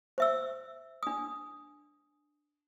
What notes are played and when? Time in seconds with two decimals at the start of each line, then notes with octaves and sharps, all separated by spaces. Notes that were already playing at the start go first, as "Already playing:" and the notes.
0.18 C5 E5 E6
1.03 D4 D#6